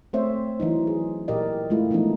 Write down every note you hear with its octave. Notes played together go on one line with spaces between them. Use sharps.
A3 C4 C5 C#5 E5
E3 F#3 D#4
G#4
A#2 G4 A#4 D5 D#5
G#3 A3 E4 F4
E3 F3 A3 B3 D4 D#4